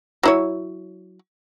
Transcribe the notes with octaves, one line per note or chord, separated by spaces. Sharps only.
F#3 E4 C#5